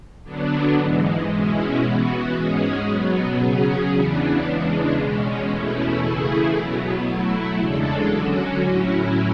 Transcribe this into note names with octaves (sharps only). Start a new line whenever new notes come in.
D3 F#3 B3 D4
G#2 E3 G#3
B2 G#3 C#4 E4
E3 B3 F#4
G#2 G#3 C#4 G#4
B2 F#3 B3
C#3 F#3 C#4 G#4
E2 C#3 E3 B3 D4
E2 C#3 E3 G#3 D4
B2 G#3 C#4
E2 B2 A3 C#4 E4
C#3 E3 A3 E4 G#4
B2 F#3 B3
F#3 A3 E4
E2 C#3 G#3 D4 A4
D3 F#3 C#4 F#4
A2 F#3 C#4 E4